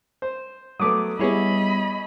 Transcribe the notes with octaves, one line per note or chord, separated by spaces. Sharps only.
C5
F#3 A3 B3 D6 D#6
G3 B3 E4 G#4 C#5 D#5 B5